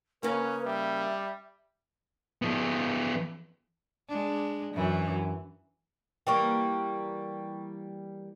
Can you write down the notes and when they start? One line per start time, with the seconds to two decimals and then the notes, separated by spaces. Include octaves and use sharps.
0.23 C#3 A#3 C#4 B4
0.65 G3 E5
2.42 F3 B3
4.09 G#3 D4
4.74 F#2 E3
6.27 E3 G3 A#3 G5 C#6